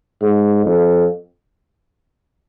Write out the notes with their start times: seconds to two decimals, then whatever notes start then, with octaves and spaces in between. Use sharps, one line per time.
0.22 G#2
0.66 F2